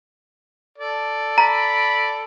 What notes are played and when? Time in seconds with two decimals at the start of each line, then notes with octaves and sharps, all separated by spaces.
0.78 A4 D5
1.38 A#5 B5